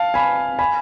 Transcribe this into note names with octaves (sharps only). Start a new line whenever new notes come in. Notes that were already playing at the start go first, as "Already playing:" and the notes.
Already playing: F5 A5
G#5 B5
G#5 B5